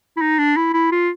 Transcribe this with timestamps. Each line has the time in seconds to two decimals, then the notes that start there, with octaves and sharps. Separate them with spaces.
0.17 E4
0.21 D#4
0.39 D4
0.57 E4
0.73 E4
0.91 F4